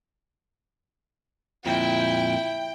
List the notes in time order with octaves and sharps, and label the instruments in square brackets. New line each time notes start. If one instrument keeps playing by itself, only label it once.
[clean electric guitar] F2 A#2 [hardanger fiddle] E4 [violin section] G5